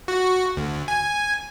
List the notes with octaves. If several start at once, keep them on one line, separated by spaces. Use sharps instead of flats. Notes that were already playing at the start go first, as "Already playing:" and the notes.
F#4
D2
G#5